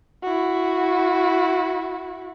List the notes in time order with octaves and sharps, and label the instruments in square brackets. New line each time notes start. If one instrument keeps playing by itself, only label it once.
[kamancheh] E4 F#4